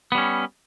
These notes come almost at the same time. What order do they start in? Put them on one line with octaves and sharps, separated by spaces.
B3 G3 C#4